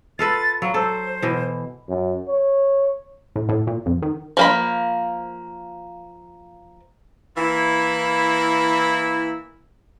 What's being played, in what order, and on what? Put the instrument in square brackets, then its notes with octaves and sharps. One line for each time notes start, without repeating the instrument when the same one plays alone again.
[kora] F4 A4 B4 [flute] A6
[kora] F#3 [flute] F5
[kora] A4 [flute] C5
[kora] B2 E3
[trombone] F#2
C#5
[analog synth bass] A2
A2
A#2
F2
D#3
[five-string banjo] F3 A#3 B5
[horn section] E3 A#3 E4